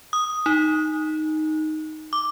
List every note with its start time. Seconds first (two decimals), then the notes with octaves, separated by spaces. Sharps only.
0.13 D#6
0.46 D#4
2.13 D6